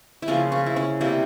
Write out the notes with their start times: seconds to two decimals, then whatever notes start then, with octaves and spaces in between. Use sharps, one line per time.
0.22 E4
0.28 C#3 F3 A#3 C#4
0.52 C#4
0.66 E4
0.76 C#4
1.01 C3 G3 A#3 E4